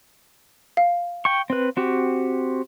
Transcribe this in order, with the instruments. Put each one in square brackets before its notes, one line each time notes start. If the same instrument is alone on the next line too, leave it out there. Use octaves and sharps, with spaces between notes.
[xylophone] F5
[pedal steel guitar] G5 C#6
C4 B4
C4 F#4 G4